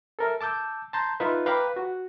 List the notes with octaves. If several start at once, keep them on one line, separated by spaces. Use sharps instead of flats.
A4 A#4 E5
A5 D6 E6 G6
A5 A#5 C6 G6
D#4 F4 B4 E5
B4 F5 G5 A#5 D6
F#4